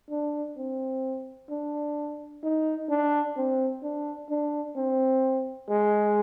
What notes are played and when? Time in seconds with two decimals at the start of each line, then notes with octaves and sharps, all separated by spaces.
0.11 D4
0.57 C4
1.50 D4
2.43 D#4
2.90 D4
3.37 C4
3.83 D4
4.30 D4
4.76 C4
5.69 G#3